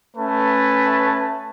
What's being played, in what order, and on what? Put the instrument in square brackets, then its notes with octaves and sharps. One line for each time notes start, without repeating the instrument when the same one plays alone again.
[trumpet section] A3 C#4 B4 A5